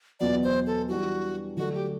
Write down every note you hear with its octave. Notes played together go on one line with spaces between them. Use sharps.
E2 B2 F#3 B3 D5
C5
A4
E3 G3 D4 F#4
D3 F#3 A3 D4 F#4 A4
G4